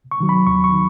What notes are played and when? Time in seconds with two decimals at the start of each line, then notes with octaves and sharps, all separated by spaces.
0.11 C#6
0.20 D#3 F#3
0.29 B5
0.47 D#2 C#6
0.64 C#6
0.73 D#3